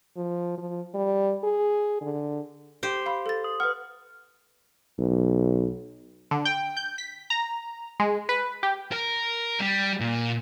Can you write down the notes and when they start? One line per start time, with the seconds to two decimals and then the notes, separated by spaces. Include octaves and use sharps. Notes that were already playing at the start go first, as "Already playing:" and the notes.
0.17 F3
0.58 F3
0.95 G3
1.44 G#4
2.01 D3
2.83 G4 C5
3.06 F5 B5
3.26 A4 A6
3.44 D#6
3.60 B4 F#5 F6
4.99 B1
6.31 D3
6.45 G5
6.77 G6
6.98 B6
7.30 A#5
8.00 G#3
8.29 B4
8.63 G4
8.92 A#4
9.60 G3
10.00 A#2